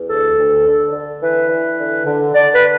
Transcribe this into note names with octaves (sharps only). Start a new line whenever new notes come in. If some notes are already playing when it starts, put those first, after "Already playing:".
Already playing: E2
D2 A4
D2
D3
D3
E3 B4
E3
D3
D3
D3 D5
B4